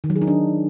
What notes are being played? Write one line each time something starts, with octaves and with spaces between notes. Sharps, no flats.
D#3
F#3
G#4
D#4
D4